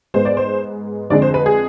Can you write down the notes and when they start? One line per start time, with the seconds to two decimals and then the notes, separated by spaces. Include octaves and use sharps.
0.14 G#2 G#3 B3 C5
0.25 D5
0.37 C5
1.10 F2 D3 G#3 D5
1.22 C5
1.34 B4
1.46 G#4